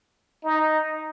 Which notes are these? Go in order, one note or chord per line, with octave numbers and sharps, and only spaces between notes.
D#4